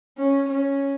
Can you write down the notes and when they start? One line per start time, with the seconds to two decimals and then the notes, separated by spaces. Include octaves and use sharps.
0.18 C#4
0.49 C#4